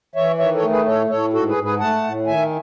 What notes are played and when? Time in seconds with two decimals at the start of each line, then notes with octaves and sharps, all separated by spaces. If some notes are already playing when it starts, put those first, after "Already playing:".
0.15 E3 C#5 E5
0.39 D#3 C#5 E5
0.54 A4 C#5
0.62 A3
0.70 G#4 B4
0.86 A2 A4 C#5
1.09 A2 A4 C#5
1.33 G#2 F#4 A4
1.48 G#4 B4
1.56 G#2
1.64 G#4 B4
1.80 A3 F#5 A5
2.04 A2
2.27 D#3 E5 G#5